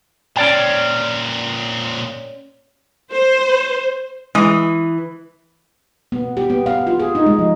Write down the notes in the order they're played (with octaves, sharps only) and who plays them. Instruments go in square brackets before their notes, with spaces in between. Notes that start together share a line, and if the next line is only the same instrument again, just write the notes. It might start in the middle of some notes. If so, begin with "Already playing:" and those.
[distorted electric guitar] A#2 C4 [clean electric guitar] C#4 D5 G5
[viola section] C5
[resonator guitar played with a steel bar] E3 [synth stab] G#3 D#6
[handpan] B3
G4
B3
F5
F4
G#4
D#4
G#3
F3